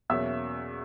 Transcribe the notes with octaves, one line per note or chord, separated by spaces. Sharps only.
E2 B2 F#3 A#3 C#4 E5 E6